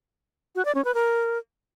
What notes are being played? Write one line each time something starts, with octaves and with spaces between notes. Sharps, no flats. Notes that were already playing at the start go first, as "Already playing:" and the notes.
F#4
D5
C#4
B4
A#4